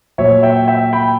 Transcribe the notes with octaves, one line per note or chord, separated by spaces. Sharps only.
A#2 F#3 C#5 E5
E5 G5
E5 G5
G5 B5